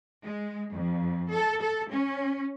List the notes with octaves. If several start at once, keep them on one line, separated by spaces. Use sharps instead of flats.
G#3
F2
A4
A4
C#4